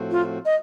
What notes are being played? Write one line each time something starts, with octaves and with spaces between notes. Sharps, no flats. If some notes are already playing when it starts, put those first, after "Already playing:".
Already playing: A2 F3 A3 C4 F#4
F4
D#5